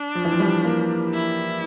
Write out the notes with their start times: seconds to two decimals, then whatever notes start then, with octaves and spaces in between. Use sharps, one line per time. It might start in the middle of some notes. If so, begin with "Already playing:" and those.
Already playing: D4
0.15 F3
0.25 E3
0.32 F3
0.40 G3
0.64 A#3
1.14 E4